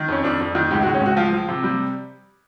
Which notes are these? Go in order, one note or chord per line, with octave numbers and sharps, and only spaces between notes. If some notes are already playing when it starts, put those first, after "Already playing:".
Already playing: D#3
F2 C#4
F2 D4
F2
D#3
C#2 G4
F#4
C#2
C#4
C#2 F#4
F3 F4
F3
C3
G3